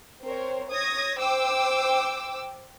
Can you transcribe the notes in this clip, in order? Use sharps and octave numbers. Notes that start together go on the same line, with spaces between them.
C4 A#4 C5 C#5
C#5 D#6 G#6 A#6
C5 G5 D6 E6